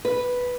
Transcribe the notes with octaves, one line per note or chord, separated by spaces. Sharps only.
B4